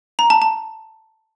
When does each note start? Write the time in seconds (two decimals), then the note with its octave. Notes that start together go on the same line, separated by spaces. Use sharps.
0.19 A#5
0.30 A5
0.42 A5